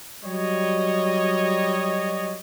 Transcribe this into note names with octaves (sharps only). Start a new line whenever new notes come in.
F#3 G3 C#5 D#5